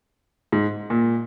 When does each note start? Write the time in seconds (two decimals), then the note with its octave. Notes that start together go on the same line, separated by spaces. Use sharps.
0.52 G#2
0.90 A#2